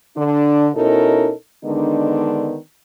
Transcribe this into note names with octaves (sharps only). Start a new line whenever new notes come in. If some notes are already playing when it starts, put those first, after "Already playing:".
D3 D4
B2 C#4 D#4 E4 A4 A#4
D3 D#3 G#3 B3 D4 D#4